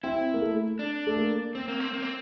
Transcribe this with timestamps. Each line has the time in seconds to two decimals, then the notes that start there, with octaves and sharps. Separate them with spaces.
0.04 C4 E4
0.34 A#3
0.42 A3
0.79 D4
1.07 A3
1.17 A#3
1.55 C4
1.68 A#3
1.80 C4
1.93 A#3
2.02 C4